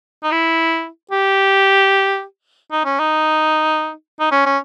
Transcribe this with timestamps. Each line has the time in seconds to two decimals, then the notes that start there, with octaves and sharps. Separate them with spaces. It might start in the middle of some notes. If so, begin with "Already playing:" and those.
0.24 D#4
0.31 E4
1.11 G4
2.72 D#4
2.85 C#4
2.99 D#4
4.20 D#4
4.32 C#4
4.46 C#4